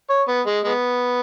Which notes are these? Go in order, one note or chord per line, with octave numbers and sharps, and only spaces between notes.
C#5
B3
G#3
G#3 B3